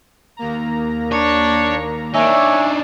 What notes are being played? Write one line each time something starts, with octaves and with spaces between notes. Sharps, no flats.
D#2 A#3 A#5
D4 C#5
D4 D#4 C#5 E5 G#5